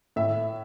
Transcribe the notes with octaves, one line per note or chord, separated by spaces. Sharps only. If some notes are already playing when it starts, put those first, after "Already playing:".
A2 E5